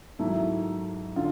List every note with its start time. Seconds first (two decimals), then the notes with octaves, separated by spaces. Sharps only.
0.19 G#2 D#3 F#3 A3 E4
1.16 D3 F4